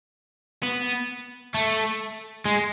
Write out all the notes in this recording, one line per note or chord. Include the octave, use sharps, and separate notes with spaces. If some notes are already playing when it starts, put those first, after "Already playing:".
B3
A3
G#3